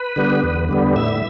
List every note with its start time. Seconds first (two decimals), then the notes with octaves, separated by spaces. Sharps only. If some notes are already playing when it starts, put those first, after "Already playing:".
Already playing: B4
0.16 D3 G3 B3
0.43 E2
0.69 D3 G3 B3
0.96 A2 E5